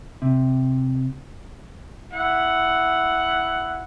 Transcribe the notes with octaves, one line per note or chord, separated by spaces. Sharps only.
C3
E4 F#5